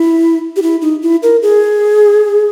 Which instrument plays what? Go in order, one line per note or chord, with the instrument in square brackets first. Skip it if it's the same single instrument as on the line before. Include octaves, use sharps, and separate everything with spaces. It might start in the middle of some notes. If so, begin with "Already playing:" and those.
Already playing: [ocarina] E4
G4
E4
D#4
E4
A#4
G#4